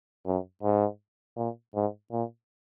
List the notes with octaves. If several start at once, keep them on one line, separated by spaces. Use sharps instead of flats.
F#2
G#2
A#2
G#2
A#2